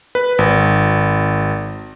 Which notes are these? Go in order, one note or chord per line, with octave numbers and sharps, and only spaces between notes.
B4
G#1